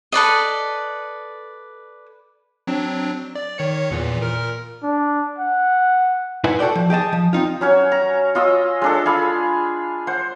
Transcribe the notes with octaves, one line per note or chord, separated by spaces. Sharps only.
A4 B4 D5 D#5
F#3 C4 D4
D5
D#3 C#5 C#7
E2 A#2 E3
A#2 A#4 F6
D4
F#5
D#4 E4 B4 C5 F#5 G#5
F#4 A4 B4 D5 G5
F3
G4 G#4 D#5 A5
F3
C4 D#4 F4
F#3 C#4 C#5
A#5
F4 D#5 D#6 E6
G#3 D4 A4
G#4 F5 B5
C5 F#5